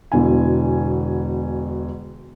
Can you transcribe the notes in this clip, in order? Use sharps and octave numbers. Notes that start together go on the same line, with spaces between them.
E1 B2 D3 E4 G#5